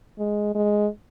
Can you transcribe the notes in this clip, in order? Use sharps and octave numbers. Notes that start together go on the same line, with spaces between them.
G#3
G#3